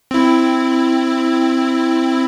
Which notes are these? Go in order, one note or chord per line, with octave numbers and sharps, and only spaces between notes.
C4 E4